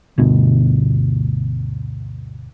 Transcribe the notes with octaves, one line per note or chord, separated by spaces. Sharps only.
G1 D2 B2